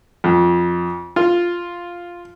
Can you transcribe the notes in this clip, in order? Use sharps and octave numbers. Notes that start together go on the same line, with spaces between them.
F2
F4